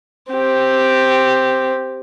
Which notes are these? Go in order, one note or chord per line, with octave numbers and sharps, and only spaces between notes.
C4 G4